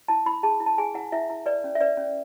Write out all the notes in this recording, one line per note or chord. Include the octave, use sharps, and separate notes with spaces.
E4 A5
E4 B5
G#4 A5
E4
A5
G#4 G#5
E4 F#5
E4 E5
E4
B4 D5
C#4
E5
B4 D5
C#4